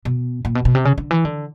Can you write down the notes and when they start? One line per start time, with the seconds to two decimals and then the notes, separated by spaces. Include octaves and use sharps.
0.05 B2
0.45 A#2
0.55 B2
0.65 B2
0.75 C3
0.85 C#3
0.98 D3
1.11 E3
1.25 D3